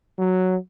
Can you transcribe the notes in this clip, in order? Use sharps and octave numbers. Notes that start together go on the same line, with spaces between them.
F#3